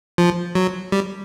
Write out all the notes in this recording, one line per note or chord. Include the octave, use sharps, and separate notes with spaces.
F3
F#3
G3